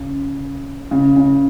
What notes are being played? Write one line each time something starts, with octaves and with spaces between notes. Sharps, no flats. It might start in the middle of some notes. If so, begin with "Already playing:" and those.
Already playing: C#3
C#3
C#3